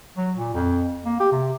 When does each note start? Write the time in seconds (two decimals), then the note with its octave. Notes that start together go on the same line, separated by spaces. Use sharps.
0.17 F#3
0.37 A#2
0.54 F2
1.05 A#3
1.20 G4
1.32 C3